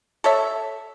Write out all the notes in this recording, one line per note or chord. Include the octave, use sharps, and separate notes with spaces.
A4 C#5 E5